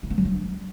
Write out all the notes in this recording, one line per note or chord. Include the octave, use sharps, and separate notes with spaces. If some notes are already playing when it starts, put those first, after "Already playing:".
E4
B3
F#3
D4